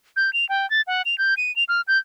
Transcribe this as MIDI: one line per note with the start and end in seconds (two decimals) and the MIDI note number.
0.16 0.33 91
0.33 0.48 101
0.49 0.68 79
0.70 0.81 93
0.87 1.02 78
1.05 1.18 101
1.18 1.34 91
1.37 1.54 99
1.56 1.64 101
1.69 1.81 89
1.88 1.98 91